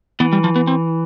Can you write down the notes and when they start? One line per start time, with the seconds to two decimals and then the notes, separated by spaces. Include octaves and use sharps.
0.20 E3 B3
0.33 G3
0.44 F3
0.56 B3
0.67 C4